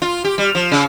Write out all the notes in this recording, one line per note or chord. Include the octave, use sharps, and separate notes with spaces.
F4
G4
G3
F3
C#3